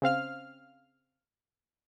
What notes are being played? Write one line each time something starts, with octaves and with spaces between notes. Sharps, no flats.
C#3 C4 F5 F6